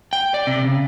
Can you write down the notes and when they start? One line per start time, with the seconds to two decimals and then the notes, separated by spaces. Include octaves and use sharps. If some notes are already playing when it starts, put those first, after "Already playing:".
0.13 G5
0.34 D5
0.47 C3
0.64 C#3